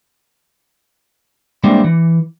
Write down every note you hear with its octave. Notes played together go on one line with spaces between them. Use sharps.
G3 G#3 A#3 C4 D4 E4
E3